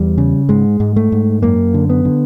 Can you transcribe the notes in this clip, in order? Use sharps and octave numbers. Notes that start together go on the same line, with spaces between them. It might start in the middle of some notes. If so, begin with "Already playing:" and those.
Already playing: E2 G3
C#3
G#2 G#3
G#2
A3
G#2
F#2 A#3
D3
B3
D3